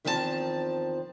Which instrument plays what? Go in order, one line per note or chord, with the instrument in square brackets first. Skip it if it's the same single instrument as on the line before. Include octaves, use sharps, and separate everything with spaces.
[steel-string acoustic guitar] E2 D#3 F3 C4 G#4 A5